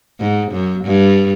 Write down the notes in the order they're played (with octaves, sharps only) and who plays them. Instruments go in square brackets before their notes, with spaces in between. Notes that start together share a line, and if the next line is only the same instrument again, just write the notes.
[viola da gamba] G#2
F#2
G2